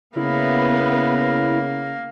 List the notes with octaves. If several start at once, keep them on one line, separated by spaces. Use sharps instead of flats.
C#3 A#3 B3 E4 B4